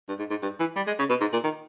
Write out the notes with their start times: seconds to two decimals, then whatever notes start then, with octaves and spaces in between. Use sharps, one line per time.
0.09 G2
0.19 G#2
0.30 G#2
0.42 G2
0.60 E3
0.76 G3
0.87 G#3
0.99 C#3
1.10 B2
1.21 G#2
1.33 A#2
1.44 D#3